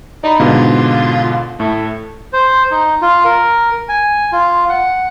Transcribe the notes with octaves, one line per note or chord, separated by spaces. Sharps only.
D#4 D5 A#5 B5
G#2 B2 D3 F4
A2 A3
C5
D#4
F4
A#4
G#5
F4
F#5